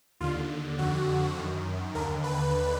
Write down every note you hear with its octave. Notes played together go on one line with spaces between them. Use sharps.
D#2 D3 F4
F2 D3 F#4
F#2 D#3
D#2 D3 A#4
B4